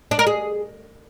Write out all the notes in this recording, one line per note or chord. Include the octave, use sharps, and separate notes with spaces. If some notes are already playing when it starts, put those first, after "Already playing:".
D4
A#4
G#4